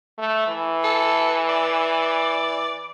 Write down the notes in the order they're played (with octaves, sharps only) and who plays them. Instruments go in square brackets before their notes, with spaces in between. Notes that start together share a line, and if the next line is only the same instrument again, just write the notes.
[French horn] A3
E3
[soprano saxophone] A4
D5